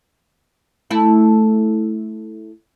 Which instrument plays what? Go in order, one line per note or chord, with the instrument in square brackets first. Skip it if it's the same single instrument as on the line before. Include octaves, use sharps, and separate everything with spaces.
[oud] A3 E4